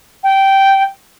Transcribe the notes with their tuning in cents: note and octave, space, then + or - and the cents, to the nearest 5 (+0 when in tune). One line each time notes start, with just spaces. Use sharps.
G5 -10